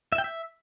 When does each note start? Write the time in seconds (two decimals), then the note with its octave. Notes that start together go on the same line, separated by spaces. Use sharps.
0.12 E5
0.18 G5
0.24 E5